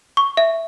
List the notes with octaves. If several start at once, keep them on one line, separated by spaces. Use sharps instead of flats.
C#6
E5